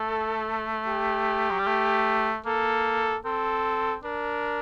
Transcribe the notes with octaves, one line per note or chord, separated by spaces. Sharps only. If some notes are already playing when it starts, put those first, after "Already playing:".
Already playing: A3 A4
G4
F#3
G3
A3
A#3 A4
C4 A4
D4 A#4